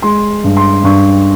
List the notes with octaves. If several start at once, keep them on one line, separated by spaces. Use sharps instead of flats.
G#3 C6
G2
C6
G2 C#6